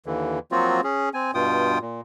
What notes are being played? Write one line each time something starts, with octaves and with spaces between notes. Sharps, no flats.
D#2 D3 E3
F3 F#3 A#3 C4 F4 F#4
C#4 G#4
C4 G#5
G2 B2 F4 G5 D#6
A#2